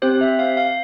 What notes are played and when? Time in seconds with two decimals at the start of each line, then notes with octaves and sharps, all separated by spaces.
0.02 C4 G4 C5
0.21 E5
0.39 F5
0.57 F5